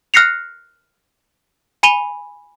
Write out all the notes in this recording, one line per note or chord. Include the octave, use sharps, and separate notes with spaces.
F6 F#6 A#6 C7 C#7 F7
G#5 B5 D#7 F7 G7